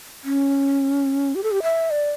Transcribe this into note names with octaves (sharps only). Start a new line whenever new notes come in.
C#4
G4
A4
G4
E5
D5